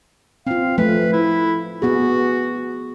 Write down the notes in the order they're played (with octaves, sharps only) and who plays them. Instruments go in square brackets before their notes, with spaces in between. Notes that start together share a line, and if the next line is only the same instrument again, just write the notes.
[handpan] C4 F4 [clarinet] F5
[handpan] F3 A3 [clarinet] B4
[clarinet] E4
[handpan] B3 G#4 [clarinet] F#4